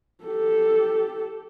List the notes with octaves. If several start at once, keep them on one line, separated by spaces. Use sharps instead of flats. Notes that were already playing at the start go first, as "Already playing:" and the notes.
G4 A4